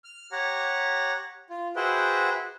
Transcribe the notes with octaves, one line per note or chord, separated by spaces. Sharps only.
F6
G4 C#5 F#5 A#5
F4
F#4 G#4 B4 C5 E5 G5